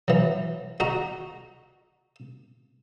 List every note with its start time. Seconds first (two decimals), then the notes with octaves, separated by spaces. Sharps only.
0.08 E3 F#3
0.80 F#4 D#5 A#5